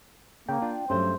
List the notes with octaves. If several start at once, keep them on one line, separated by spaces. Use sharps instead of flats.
C#3 A#3 G5
D4 F4
G2 F#3 A3 C#4 C5